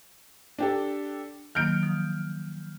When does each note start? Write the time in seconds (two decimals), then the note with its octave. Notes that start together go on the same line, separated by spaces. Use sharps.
0.58 D4 G4 A4
1.55 D#3 F#3 A#3 F6 G6 D7
1.83 F3 D#6